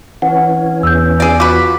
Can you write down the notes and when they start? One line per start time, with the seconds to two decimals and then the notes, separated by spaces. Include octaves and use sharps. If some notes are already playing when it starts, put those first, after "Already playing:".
0.22 E3 C#4 F#5
0.83 E2 E6 G6
1.20 G#4 D5
1.40 F4 F#4 B4 D6